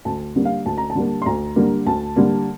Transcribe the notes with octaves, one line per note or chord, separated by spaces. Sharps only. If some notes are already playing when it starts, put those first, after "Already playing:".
D2 A5
D3 G3 A#3
F5
D2 A5
A#5
A5
D3 G3 A#3
C6
D2 A#5
D3 G3 A#3
D2 A5
D3 G3 A#3